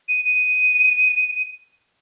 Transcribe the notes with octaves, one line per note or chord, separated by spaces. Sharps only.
D#7
D#7